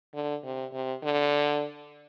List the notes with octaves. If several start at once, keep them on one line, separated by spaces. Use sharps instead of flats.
D3
C3
C3
D3